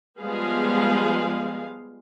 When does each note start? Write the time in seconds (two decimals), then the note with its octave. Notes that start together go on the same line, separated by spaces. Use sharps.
0.20 F3 G3 G#3 B3 G#4 F5